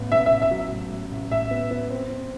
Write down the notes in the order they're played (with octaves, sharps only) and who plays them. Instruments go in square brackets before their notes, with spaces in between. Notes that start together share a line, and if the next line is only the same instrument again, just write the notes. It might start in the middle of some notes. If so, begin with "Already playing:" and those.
Already playing: [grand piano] A1 A2 B3
[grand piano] A1 [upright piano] E5
[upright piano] E5
[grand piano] A1
[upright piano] E5
[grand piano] F#3
A2
A2
A1
[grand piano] A2 [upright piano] E5
[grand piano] B3
B3
C4
C4